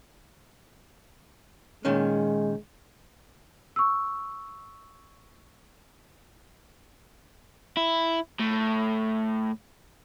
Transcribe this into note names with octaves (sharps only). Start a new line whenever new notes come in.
A#2 D#3 G#3 C#4
C#6 E6
E4
A2